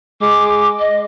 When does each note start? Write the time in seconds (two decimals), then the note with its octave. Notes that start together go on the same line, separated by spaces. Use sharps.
0.21 G#3 D6
0.80 D#5